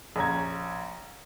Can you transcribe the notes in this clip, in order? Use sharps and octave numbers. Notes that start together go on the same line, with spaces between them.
A#1 C#4 A#5 G#6